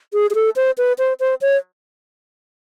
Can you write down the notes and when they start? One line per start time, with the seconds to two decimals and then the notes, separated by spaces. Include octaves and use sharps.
0.13 G#4
0.31 G#4
0.35 A4
0.56 C5
0.78 B4
0.99 C5
1.20 C5
1.41 C#5